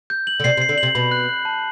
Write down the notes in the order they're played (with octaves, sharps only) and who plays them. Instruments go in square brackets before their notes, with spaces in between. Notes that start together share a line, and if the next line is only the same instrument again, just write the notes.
[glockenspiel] G6
F#7
[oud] D3
[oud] C3 [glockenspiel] C7
[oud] C3
[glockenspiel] C7
[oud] D3
[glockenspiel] F#7
[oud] C3
[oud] B2 [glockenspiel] B5
[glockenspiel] F#6
F#6
A5